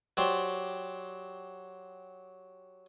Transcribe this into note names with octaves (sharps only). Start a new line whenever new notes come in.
F#3 G4 C5 D5 A5